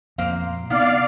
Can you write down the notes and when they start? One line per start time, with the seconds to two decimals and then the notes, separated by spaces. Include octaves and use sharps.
0.18 F2 A#2 A#3 C5 F5
0.70 C3 B3 D#4 E4 D5 F5